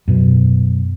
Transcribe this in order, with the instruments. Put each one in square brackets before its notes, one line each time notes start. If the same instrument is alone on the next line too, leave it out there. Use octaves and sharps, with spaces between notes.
[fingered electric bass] F#2 B2